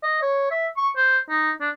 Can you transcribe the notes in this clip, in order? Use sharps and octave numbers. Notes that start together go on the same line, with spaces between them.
D#5
C#5
E5
C#6
C5
D#4
D4